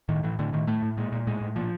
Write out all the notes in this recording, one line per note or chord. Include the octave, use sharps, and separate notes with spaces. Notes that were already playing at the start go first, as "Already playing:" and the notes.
A2 D#3
A2 E3
A2 D3
A2 D#3
A2 A3
A2
A#2 G#3
A#2
A2 G#3
A2
A#2 F3